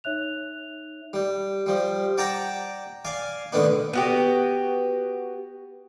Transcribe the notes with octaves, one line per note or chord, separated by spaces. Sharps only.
D#4 C#5 E5 F#6 F7
G3
F3 G3
D5 F#5 G5 A5 A#5
D5 F5 G#5
A2 D3 D#3 B3 D4
B3 F#4 G4